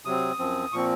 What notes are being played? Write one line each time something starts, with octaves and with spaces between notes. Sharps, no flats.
C3 F#3 C4 D#6
F#2 F3 C4
A#2 F3 C4 C#6